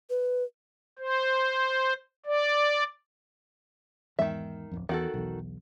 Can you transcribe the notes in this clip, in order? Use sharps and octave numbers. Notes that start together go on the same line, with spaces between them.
B4
C5
D5
E2 G#2 D#3 E5
D1 G#1 F2
E2 D#3 F#4 A4
B1 E2